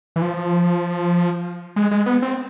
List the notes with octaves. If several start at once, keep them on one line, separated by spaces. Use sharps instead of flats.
E3
F3
G#3
G#3
B3
C4